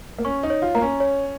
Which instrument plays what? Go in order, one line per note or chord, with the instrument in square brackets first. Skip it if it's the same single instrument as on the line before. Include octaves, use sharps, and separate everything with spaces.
[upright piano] A#3
[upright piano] C#4 [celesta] C#6
[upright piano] D#4
[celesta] C#5
[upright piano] F4
[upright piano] A#3 [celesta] A#5
[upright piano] C#4
[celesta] C#5